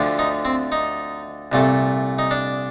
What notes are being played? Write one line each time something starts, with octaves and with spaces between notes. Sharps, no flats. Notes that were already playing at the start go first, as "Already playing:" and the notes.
Already playing: D2 D3 F3
D#4
C4
D#4
C2 A#2 A3
D#4
D4